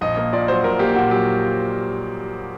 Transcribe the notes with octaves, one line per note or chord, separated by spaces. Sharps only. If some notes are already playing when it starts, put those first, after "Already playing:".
A#1 D#5
A#3
A#2 D5
F#3 C5
A#1 A#4
A#3 G4
A#2 F#4
F#3 G4